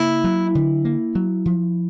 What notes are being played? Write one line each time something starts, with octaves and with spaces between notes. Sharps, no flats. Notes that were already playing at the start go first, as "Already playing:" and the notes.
Already playing: C#3 A#3 E4
F#3
D3
A#3
F#3
F3